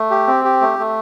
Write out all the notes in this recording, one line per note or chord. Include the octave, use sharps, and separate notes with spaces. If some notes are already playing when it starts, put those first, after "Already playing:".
Already playing: A3
G4
C4
G4
A3
A3